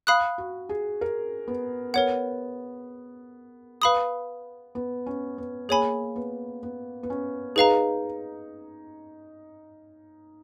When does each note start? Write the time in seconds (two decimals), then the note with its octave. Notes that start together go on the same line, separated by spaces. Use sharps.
0.07 F5 B5 D#6 F#6
0.38 F#4
0.69 G#4
1.01 A#4
1.48 B3
1.94 B3 A#4 C#5 F#5
3.82 B4 F5 B5 D#6
4.75 B3
5.06 C#4
5.38 B3
5.69 A#3 G#4 C#5 G#5 B5
6.16 B3
6.63 B3
7.03 B3
7.10 C#4
7.56 D#4 G#4 B4 F5 A#5